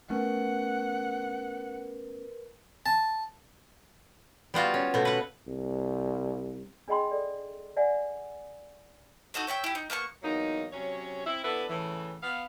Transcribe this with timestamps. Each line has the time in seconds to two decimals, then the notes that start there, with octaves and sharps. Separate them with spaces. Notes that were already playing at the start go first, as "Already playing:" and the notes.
0.10 A3 B3 C#4 A#4 B4 F#5
2.86 A5
4.54 G3 B3 F4 F#4
4.74 C#4
4.94 B2 A3
5.05 B4 F#5
5.48 C2
6.88 D4 G#4 D#5 G5 B5 C6
7.11 A4 D5
7.77 D5 E5 F#5 G#5
9.34 D#4 F#4 A4 D#5
9.47 C#5 E5 F#5 G5
9.64 E4 G4
9.75 D#4
9.90 A#3 B3 G5 C#6
10.23 E2 F#3 A#3 D#4
10.73 C3 F#3 C#4 C#5
11.26 C4 E4
11.44 B3 D4 E4 A4 B4
11.69 A2 C#3 E3
12.23 B3 F5